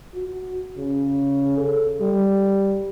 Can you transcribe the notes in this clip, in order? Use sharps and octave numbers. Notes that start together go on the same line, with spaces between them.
F#4
C#3
A4
G3